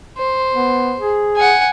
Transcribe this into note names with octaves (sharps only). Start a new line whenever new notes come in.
C5
B3
G#4
F#5 G#5